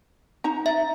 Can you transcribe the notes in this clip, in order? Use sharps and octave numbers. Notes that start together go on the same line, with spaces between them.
D#4 A#5
E5